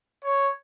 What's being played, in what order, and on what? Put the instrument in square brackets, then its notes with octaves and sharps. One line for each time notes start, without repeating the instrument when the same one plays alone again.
[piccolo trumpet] C#5